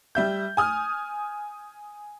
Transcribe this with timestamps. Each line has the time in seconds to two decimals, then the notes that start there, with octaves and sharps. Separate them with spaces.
0.15 G3 E5 G6
0.57 G#5 D#6 F6